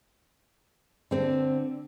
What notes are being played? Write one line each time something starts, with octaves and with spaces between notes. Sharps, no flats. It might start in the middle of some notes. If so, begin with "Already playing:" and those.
D3 C4